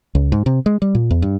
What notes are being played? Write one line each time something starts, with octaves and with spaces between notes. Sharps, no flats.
C#2
G#2
C3
G#3
G3
A#2
E2
G2